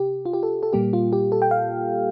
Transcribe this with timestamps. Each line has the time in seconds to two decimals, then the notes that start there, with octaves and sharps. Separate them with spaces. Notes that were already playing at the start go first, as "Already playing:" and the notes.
Already playing: C3 G4
0.26 F4
0.33 G4
0.43 A4
0.63 A4
0.73 A#2 G3 A#3 G4
0.93 F4
1.13 G4
1.32 A4
1.42 G5
1.51 F5